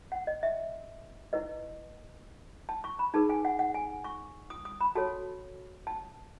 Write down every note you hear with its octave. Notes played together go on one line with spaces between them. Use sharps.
F#5
D#5
E5
E4 B4 D#5
A5
C#6
B5
D#4 G#4 B4 A5
G#5
F#5
F#5
G#5
C#6
D#6
D#6
B5
F#4 A4 C#5 A5
A5